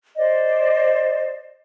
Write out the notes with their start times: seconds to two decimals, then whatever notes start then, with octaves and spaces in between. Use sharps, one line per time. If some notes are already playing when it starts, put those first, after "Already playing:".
0.17 C5 D5 D#5